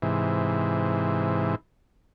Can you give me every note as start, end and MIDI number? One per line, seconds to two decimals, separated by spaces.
0.02 1.55 44
0.02 1.55 48
0.02 1.55 52